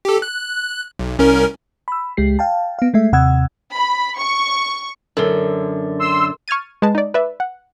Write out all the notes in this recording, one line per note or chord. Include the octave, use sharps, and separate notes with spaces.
G4 A4
F#6
B1
C2 C#4 A#4
B5 E6
C#2 G#3 G4 C7
F5 G5 A5
B3 F5
G#3 A3 E5
D#2 C3 F#5 E6 G#6
B5
C#6
F#2 D3 A4 A#4
C6 E6
C#6 F6 G#6 A6 D#7
G#3 B4 A5
D#4 D5
B4 D5 E5
F#5